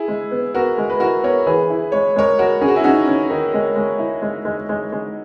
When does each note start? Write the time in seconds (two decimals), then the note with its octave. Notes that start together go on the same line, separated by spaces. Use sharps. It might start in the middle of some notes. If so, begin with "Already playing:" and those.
Already playing: E4 G#4
0.08 G#3
0.31 B3
0.54 B3 F#4 A#4
0.78 G#3
0.90 B4
1.00 E4 F#4 A#4
1.23 B3 A#4 C#5
1.47 E3 G#4 B4
1.70 E4
1.92 G#3 C#5
2.16 G#3 A#4 C#5
2.39 G#3 F#4 A#4
2.61 C#4 G#4
2.68 F#4
2.76 E4 G#4
2.84 C#4 D#4 F#4
3.08 C#4
3.30 D#3
3.54 G#3
3.76 G#3
3.99 E4
4.22 G#3
4.45 G#3
4.69 G#3
4.92 G#3